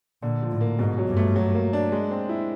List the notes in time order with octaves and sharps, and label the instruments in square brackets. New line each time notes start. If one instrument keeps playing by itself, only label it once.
[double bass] A#2 [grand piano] D3
[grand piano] F3
[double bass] A2
[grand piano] A#3
[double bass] G#2 [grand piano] B2
[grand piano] F#3
[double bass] G2
[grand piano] A3
F#3
A#3
D4
G#3
C4
E4